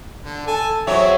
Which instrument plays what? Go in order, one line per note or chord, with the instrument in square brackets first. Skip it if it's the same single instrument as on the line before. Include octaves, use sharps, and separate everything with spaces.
[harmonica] D3
[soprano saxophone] A4 [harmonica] G#5 A5
[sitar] F#3 C#5 [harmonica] C4 G#4 [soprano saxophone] E5